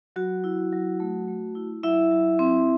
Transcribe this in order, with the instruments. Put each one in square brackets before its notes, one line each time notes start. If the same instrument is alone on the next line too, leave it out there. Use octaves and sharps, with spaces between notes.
[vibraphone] F#3 F#4
E4
F#3
A3
A3
E4
F#3 E4 E5
F#3
C4